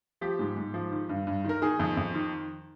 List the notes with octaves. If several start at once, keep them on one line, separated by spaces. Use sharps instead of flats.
F3 G4
G#2
G#2
F3
D#3
G2
G2
D#3 A#4
D#3 G#4
F2
F2
D#3